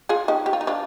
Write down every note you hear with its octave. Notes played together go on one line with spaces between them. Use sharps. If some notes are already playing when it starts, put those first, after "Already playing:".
F4 G#4
D#4 G4
G4
F4
D#4
D4 F4